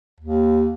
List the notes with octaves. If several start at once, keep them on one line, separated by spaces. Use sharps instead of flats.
D#2